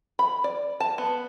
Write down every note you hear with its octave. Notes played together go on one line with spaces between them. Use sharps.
B5
D5
A5
B3